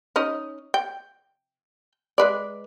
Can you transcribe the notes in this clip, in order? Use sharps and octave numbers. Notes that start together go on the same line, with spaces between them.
C#4 D#4 D#5
G5
G#3 B4 D5